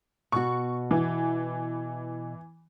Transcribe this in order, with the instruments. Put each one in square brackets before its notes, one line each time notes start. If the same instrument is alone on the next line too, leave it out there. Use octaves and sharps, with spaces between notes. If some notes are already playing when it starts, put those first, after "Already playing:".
[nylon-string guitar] B2 F#4 [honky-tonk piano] C#6
[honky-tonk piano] E3